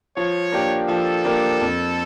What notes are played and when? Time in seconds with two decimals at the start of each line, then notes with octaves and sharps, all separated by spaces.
0.17 F3 C#5
0.52 A#3 D4 G4 A#4
0.88 F3 A4
1.25 A#3 D4 G4 A#4
1.61 F2